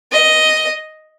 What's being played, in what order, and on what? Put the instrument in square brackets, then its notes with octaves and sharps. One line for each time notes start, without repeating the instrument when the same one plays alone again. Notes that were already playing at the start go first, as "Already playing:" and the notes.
[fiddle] D#5